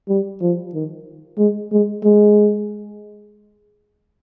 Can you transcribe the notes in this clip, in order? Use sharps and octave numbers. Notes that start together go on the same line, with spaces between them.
G3
F3
D#3
G#3
G#3
G#3